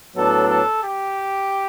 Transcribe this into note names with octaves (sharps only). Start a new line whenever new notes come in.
A2 F#3 B3 D4 A4
A4
G4